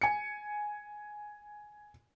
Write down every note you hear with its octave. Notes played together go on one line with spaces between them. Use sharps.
G#5 C#7